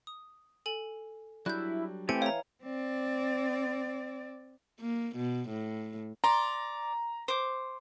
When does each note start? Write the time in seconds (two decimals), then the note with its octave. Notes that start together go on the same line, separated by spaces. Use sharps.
0.07 D#6
0.66 A4 G#5 F#7
1.46 F#3 G3 D4 E4 F#6 G6
2.09 E3 A3 C4 G4 G5 G#5 C#7
2.22 C#5 F5 A#5
2.63 C4 D5
4.81 A#3
5.16 B2
5.49 A2
6.24 D5 A#5 C6
7.28 C5 D6